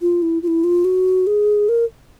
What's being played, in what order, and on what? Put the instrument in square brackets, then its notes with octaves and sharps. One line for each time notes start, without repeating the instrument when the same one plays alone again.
[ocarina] F4
E4
F4
E4
F4
F#4
G#4
A#4